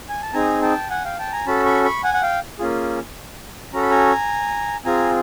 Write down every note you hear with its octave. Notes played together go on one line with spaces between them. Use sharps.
G#5
A5
C4 D#4 G#4 G#5 A#5
G5 A5
F#5 G#5
F5 G5
G5 A5
G#5 A#5
C#4 F#4 A4 A5 B5
B5 C#6
B5 C#6
F#5 G#5
F#5
F5 G5
A#3 C#4 F4 G#4
C#4 F#4 A4 A#5
B5
G#5 A#5
C4 F4 G#4 G#5 A#5